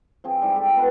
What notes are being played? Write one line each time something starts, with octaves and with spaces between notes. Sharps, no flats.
F3 C4 G#4
G#2 G3 E4
G4 A4
B2 B4 F#5